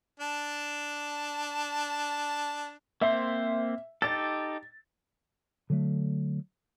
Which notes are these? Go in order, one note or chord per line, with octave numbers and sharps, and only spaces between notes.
D4 A5
A#3 C4 C5 E5
D#4 G4 A4 A6
D3 F#3 A3